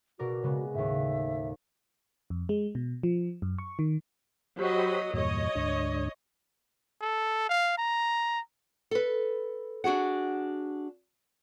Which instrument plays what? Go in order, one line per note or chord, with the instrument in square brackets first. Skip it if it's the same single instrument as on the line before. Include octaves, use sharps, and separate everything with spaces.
[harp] B2 A#4 D5 [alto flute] F#4
[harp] C#3 G#3 B3
[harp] D#2 A2 [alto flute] E5
[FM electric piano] F2
G#3
B2
F3
F#2
C#6
D#3
[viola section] F#3 F#4 D#5 [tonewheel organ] G4 C5 B5
[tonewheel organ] E2 G2 A#2 [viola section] C#5 D#5
[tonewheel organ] D2 G#2 D4
[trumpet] A4
F5
A#5
[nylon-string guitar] A4 B4
D4 F#4 G#4 F#5